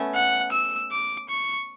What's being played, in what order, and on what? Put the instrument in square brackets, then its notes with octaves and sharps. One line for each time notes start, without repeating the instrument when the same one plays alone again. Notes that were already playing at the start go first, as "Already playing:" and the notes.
Already playing: [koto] A3 B3 C#4
[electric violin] F#5
E6
D6
C#6